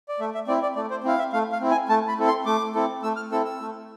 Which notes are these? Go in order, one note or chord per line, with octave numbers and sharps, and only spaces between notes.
D5
A3 E5
E5
C4 E4 D5
D5
A3 D5
C5
C4 E4 F5
E5
A3 F5
F5
C4 E4
G#5
A3 A5
B5
C4 E4 A4
C6
A3 D6
C4 E4 A4
A3 E6
F6
C4 E4 A4 E6
E6
A3